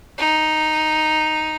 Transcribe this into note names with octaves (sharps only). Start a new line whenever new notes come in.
D#4